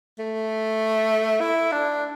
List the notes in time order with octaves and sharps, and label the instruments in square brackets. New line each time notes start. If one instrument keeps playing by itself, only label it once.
[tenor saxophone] A3
E4
D4